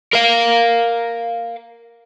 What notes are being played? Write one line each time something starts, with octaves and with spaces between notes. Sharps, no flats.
A#4 F5